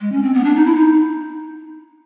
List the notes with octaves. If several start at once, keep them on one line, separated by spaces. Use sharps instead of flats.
G#3
C#4
C4
B3
D4
D#4
E4
D#4